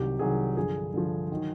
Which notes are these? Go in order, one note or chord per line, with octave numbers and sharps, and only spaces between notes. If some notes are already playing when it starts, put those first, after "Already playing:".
Already playing: C2 C3 D#3 F#3 G4
C2 C3 D#3 F#3 G#4
G2 D3 F3 G#4
G2 D3 F3
D#3 F#3